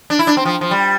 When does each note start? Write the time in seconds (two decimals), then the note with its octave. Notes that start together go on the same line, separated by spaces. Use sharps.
0.10 D4
0.19 E4
0.27 D4
0.37 C4
0.46 F3
0.61 F3
0.71 G3